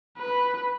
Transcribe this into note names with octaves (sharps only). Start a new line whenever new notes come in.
B4